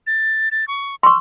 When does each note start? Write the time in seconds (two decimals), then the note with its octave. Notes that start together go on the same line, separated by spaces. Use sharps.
0.07 A6
0.51 A6
0.68 C#6
1.03 C6 C#6 E6